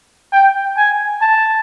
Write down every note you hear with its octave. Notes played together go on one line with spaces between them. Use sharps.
G5
G#5
A5